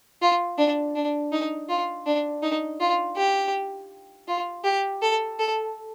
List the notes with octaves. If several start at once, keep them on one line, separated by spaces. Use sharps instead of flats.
F4
D4
D4
D#4
F4
D4
D#4
F4
G4
F4
G4
A4
A4